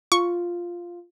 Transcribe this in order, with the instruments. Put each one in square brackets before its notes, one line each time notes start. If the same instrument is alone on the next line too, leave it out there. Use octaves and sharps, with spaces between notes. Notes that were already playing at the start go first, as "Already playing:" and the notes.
[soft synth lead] F4 [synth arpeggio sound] C#6